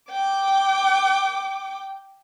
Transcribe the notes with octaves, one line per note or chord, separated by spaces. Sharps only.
G5 D6